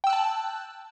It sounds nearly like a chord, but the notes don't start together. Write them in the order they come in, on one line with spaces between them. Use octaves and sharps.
G5 E6 F#6 A5